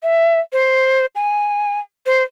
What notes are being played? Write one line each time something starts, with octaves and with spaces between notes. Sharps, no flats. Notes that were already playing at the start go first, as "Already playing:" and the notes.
E5
C5
G#5
C5